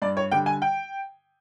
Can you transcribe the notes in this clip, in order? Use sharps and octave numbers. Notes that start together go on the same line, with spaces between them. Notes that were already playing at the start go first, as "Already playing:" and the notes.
G2 D5
C#5
D3 G3 G5
G#5
G5